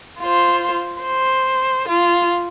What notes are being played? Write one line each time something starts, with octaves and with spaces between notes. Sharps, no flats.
F4 C5
C5
F4